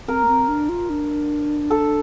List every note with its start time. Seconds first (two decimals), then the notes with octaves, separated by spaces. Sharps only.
0.08 C4 A#4
0.23 A#3
0.28 C4
0.48 D4
0.69 F4
0.90 D4
1.70 A4